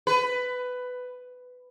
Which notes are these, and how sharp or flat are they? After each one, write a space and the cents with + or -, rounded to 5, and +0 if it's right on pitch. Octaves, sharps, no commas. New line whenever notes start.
B4 +15